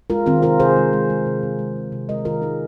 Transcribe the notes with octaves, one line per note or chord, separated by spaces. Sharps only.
G#3 F4 A#4
D#3 C4 F4
C3 F4 A#4
C3 G#4 C5
G#3
G#3
G#3
C3
C3
G#3
C3
C3
G#3 A#4 D#5
D#3 F4 A#4
G#3 D#4 G#4